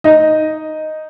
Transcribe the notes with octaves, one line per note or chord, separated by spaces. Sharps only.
D#4 D#5